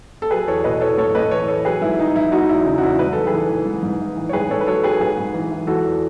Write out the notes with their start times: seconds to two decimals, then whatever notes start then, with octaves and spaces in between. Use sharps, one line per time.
0.22 A4
0.31 F#3 G#4 B4
0.47 E2 A4 C#5
0.64 B2 B4 D#5
0.81 E2 A4 C#5
0.98 A2 A4 C#5
1.15 A2 B4 D#5
1.31 E3 A4 C#5
1.48 E3 A4 C#5
1.65 F#3 G#4 B4
1.81 G#2 E4
1.98 D#3 D#4
2.16 G#2 E4
2.32 F#3 D#4 F#4
2.49 E2 E4
2.65 C#3 D#4
2.78 F#4
2.82 E2 E4
2.99 G#2 B4
3.13 G#2 A4
3.27 G#4 B4
3.32 E3
3.49 E3
3.66 G#2
3.83 G#2
4.01 E3
4.17 E3
4.29 C#5
4.33 G#2 G#4 B4
4.50 G#2 A4 C#5
4.61 B4
4.67 F#3 A4 C#5
4.83 F#3 G#4 B4
5.00 G#2 G#4 B4
5.18 G#2
5.34 E3
5.51 E3
5.67 E3 F#4 A4
5.84 E2